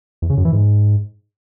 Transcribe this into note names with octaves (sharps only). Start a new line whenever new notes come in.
E2
C#3
F#2
E3
G#2